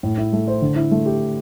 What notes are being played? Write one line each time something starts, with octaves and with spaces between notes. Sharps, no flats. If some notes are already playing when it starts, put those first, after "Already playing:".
A2
E4
A3
C5
D3
E4
A3
G4